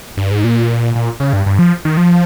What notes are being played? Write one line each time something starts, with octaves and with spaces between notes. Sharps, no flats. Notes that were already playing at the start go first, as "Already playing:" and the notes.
G2
G#2
A#2
A#2
C#3
G2
G2
F3
D#3
F3